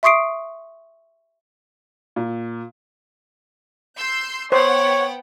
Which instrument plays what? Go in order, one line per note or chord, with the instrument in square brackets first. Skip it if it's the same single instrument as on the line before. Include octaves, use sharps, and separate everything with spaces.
[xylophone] E5 C6 C#6 D#6 C7 D7
[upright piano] A#2
[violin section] C6 E6 G6
[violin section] B3 F#5 G5 [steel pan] C5 [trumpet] C#5